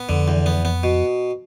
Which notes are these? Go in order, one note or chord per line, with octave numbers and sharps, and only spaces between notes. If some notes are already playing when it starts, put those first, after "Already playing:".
Already playing: B3
F2 D3
E2
B3
B3
B2